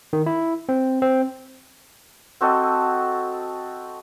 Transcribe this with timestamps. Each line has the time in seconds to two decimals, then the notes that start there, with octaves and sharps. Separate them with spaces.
0.13 D#3
0.26 E4
0.69 C4
1.02 C4
2.41 C4 F#4 A4 D#5